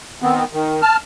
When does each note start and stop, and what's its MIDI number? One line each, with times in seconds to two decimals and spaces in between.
0.22 0.44 51
0.22 0.44 59
0.22 0.44 60
0.53 0.81 51
0.82 0.97 81
0.82 0.97 89